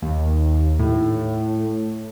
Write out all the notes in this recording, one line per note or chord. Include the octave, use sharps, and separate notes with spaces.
D#2
A2